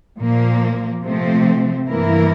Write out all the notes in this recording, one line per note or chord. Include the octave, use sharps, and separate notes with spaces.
A#2 F3 A#3
C3 F3 A3 C4
G2 E3 A#3 E4 A#4